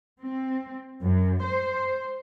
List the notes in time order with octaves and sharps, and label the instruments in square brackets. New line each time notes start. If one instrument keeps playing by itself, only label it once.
[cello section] C4
F#2
C5